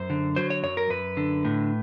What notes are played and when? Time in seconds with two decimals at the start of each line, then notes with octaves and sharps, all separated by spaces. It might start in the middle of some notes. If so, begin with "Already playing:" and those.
Already playing: F#2 C5
0.10 D3
0.36 F#3 C5
0.50 C#5
0.63 F#2 C#5
0.77 A#4
0.90 F#2 B4
1.17 D3
1.45 A2